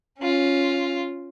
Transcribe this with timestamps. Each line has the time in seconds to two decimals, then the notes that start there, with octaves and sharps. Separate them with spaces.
0.19 C#4 F4